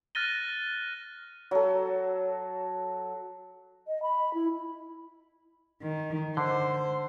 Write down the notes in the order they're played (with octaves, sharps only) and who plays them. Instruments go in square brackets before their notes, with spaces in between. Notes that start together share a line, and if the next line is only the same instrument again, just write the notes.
[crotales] F6 F#6 A6 A#6 D#7 G7
[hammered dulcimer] F#3 A4
[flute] D#5
B5
E4
[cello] D#3
[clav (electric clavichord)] D3 [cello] C5